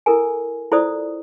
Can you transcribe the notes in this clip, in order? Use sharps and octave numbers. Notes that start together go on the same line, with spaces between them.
E4 A4 A#4 G#5
E4 F4 A4 C5 D5 D#6